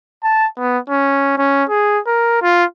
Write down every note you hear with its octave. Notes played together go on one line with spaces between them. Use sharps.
A5
B3
C#4
C#4
G#4
A#4
F4